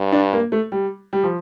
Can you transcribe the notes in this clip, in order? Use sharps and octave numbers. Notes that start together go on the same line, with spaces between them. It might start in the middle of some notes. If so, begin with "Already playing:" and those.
Already playing: G2
D4
A#3
A3
G3
G3
F3